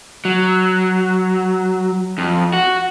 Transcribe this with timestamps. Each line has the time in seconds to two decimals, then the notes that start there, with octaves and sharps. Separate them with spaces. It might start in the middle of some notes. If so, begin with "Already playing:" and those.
0.25 F#3
2.18 F2
2.53 F#4